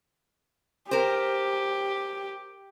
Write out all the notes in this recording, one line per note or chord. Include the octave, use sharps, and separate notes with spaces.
G4 A#4 C5